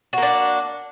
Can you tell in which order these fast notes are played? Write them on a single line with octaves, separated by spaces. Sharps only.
F#4 A#3 D4